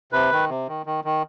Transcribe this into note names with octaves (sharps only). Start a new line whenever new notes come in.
C3 B4
D#3
C3
D#3
D#3
D#3